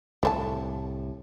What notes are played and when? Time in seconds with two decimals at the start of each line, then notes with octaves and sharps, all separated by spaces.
0.23 C2 A2 A3 C5 A5